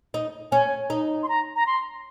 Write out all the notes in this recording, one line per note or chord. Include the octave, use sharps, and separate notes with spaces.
D#4
C#4 G#5
D#4
C6
A#5
A#5
C6